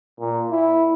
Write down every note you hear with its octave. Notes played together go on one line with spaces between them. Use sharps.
A#2
E4